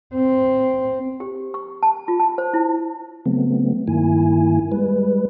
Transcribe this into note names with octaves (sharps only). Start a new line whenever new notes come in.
C4
G4
C#6
A5
F4
A5
C5
E4
C#3 F#3 A3 B3 C4
G2 D#3 A#3 E4 G#5
G3 G#3 B4